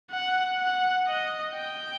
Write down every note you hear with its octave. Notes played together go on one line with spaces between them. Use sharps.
F#5
F#5
D#5
G5